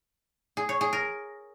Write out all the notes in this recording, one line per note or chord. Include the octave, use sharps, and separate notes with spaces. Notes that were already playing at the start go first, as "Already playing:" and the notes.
G#4
C#5
G#4
A#4